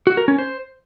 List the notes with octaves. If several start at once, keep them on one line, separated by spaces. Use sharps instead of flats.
F#4
A#4
C#4
C5